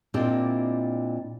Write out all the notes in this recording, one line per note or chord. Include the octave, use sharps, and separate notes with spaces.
A#2 C4 D4 E4 G4 D#5